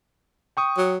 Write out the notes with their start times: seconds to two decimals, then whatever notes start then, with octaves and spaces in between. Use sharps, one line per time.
0.57 G5 C#6 D#6
0.78 F#3